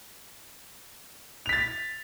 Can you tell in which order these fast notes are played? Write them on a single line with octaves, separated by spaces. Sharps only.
F7 B6 A6